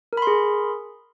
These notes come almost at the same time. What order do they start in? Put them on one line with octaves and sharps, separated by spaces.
A#4 B5 C6 G#4